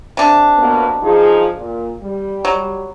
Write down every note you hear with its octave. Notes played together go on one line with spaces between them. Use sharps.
C3 D4
B2 A#3 B3
F3 D#4 G#4
A#2
G3
F#3